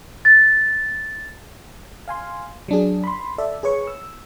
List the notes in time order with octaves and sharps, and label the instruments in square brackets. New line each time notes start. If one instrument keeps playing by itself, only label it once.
[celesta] A6
[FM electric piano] F5 G#5 C6
F#3 D4 G#4
B5 C6
A4 D5 E5
G#4 B4 C#5 C#6
E6